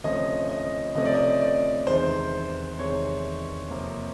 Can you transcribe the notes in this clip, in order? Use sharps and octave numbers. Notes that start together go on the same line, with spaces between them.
D2 C3 F3 A3 C#4 D#5
D#5
D2 C3 F3 A3 C#4 D#5
D5
D#5
D5
E2 C3 D#3 G#3 C5
E2 C3 D#3 G#3 C#5
F2 C3 F3 A#3